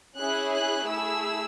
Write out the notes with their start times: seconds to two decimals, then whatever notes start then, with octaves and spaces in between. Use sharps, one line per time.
0.17 C#4 E4 G#4 F#6
0.52 F#6
0.88 A3 E4 G#4 E6